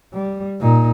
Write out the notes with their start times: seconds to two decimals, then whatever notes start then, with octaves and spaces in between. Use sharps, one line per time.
0.14 G3
0.60 A#2 D#4